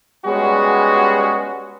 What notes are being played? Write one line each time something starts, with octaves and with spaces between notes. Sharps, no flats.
G3 G#3 B3 C#4 F#4 G#4